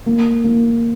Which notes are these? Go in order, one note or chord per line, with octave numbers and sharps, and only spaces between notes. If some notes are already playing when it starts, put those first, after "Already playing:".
A#3
A#3